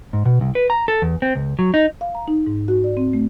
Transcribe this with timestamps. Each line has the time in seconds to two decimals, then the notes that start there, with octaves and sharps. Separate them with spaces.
0.13 G#2
0.26 B2
0.41 C2
0.55 B4
0.70 A#5
0.88 A4
1.02 E2
1.22 C4
1.35 C#2
1.59 F#3
1.74 D#4
2.01 F5
2.15 A#5
2.28 D#4
2.47 G#2
2.68 F#4
2.84 D5
2.97 C4
3.13 A3